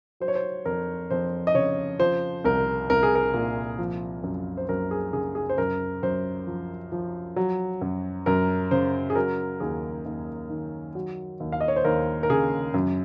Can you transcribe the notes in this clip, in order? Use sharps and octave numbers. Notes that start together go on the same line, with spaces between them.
F#3 C5
C#5
C5
F2 A#4
F2 C5
D#5
C#3 C#5
F3 C5
C2 A#4
C2 A#4
G#4
A#4
A#2
F3
F#2
C5
F#2 A#4
G#4
C#3 G#4
G#4
C5
F#2 A#4
F#2 C5
F3
F3
F#3
F#2
F#2 A#4
C#3 C5
G#4
F#3 A#4
D#2 G#4
D#2
D#3
F#3
D#2
F5
D#5
C#5
C5
D#2 A#4
A#4
C#3 G#4
F#2